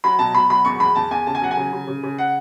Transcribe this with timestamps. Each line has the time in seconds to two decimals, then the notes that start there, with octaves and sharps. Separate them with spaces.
0.04 F#3 B5
0.19 B2 A5
0.34 B2 B5
0.50 F#3 B5
0.65 E2 C#6
0.80 E2 B5
0.95 E2 A5
1.11 E2 G#5
1.27 C#3 A5
1.35 G#5
1.42 F#3 F#5
1.51 G#5
1.57 C#3
1.72 C#3
1.87 C#3
2.03 C#3
2.18 F#5